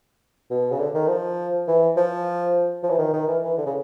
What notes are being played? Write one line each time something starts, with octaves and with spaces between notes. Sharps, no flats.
B2
C#3
D3
D#3
F3
E3
F3
F3
E3
D#3
D#3
E3
E3
D3
C#3